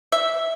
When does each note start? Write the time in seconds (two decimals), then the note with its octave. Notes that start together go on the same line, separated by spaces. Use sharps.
0.12 E5